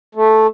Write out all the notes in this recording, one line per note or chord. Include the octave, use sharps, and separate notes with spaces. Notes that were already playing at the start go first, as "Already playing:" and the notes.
A3